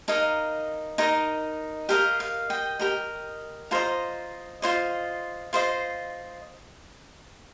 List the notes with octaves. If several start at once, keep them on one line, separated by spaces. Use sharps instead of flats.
D#4 A#4 D#5 F5
D#4 A#4 D#5
G4 A#4 D#5 F5
F5
D#5 G5
G4 A#4 D#5
F4 C5 D#5 F5 A#5
F4 C5 D#5
F4 C5 D#5